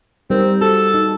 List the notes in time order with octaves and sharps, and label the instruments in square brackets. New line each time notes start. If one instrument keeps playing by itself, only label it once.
[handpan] G3 D#4 A#4 [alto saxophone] C4
[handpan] F#4 [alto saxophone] A4
[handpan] D#4